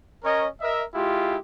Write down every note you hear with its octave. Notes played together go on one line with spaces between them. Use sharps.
C#4 A#4 C#5 D#5
A#4 D#5 E5
G#3 E4 F4 G4